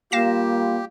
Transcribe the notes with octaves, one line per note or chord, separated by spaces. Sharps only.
G3 A#3 F4 G4 F5 A#6 E7